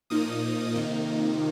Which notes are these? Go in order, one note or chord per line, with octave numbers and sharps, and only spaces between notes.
A#2 F3 A#3 D#4 D#6
F2 C3 D#3 A#3 D#4